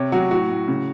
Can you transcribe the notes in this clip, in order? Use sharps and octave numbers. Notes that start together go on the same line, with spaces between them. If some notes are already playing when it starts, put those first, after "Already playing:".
Already playing: C3 C#5
F#3 F#4
A2 F#4
A2
C#3